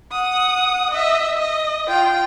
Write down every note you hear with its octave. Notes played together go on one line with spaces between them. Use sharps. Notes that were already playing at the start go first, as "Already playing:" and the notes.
F#5 D#6
D#5 E5
D#5
F4 G5